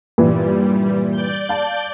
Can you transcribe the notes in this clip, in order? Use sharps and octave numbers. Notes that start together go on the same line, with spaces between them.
G2 A#2 E3 G3
D5 G6
F5 A5